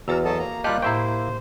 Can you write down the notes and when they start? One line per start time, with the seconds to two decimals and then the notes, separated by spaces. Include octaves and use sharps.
0.08 E2 F#4 B4 A#5 E6 F6
0.25 F#3 A4 D#5 A5
0.39 A#3 A#5
0.64 G3 F4 G4 D#5 F5 A5 F#6
0.82 A2 E4 C5 E5 G5 C#6